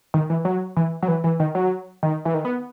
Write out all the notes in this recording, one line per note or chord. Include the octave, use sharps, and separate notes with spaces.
D#3
E3
F#3
E3
F#3
E3
E3
D#3
F#3
D#3
E3
D#3
B3